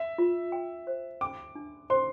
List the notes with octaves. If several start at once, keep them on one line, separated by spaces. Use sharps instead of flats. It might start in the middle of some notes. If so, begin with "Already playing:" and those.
Already playing: E5
F4
G5
C5
G5 D6
D4
C5 C6